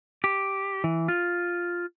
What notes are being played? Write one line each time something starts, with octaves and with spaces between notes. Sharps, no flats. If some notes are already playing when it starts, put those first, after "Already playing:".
G4
E3
F4